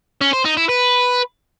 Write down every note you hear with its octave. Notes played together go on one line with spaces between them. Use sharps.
C#4
C5
D#4
E4
B4